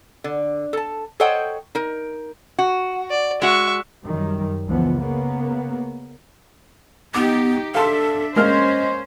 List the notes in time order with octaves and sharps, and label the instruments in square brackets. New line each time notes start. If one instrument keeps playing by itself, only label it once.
[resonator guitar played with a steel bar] D3
A4 A5
A4 C5 C#5 D#5 F#5 G5
D#4 A#4
F#4
[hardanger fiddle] D5
[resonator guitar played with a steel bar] G#3 F#4 [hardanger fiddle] E5 C#6
[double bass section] F#2 D#3 G3
C#2 E3 F3 B3
C#3 A#3 B3
[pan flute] B3 [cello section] D#4 G4 [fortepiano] D6
[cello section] D4 E5 [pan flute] A4 [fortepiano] F5 A5 C6
[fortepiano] G#3 A#3 F6 [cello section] C#4 C5 [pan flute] D#5